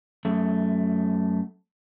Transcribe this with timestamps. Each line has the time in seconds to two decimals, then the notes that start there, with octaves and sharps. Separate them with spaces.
0.25 F#2 A3